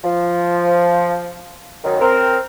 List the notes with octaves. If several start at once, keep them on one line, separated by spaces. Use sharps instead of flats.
F3
F#2 D#3
C4 A#4